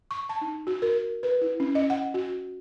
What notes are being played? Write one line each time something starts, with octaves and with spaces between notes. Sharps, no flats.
C#6
A5
D#4
F#4
A#4
B4
E4
C#4
D#5
F#5
F#4